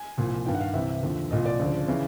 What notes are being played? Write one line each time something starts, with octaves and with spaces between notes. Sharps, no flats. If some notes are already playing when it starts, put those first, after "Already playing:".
Already playing: G#5
C2 A#2 F3
G2 D#3 G5
F#5
F5
C2 C3 E3 E5
D#2 D3 F3
C2 A#2 F3 D#5
D5
D2 C#3 F3
C#3 E3